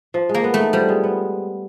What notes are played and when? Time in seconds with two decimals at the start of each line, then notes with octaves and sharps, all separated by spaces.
0.14 F3
0.29 G#3
0.34 A#3
0.44 B3
0.54 A3
0.59 D#4
0.73 F3 G3
0.89 G#3
1.04 B3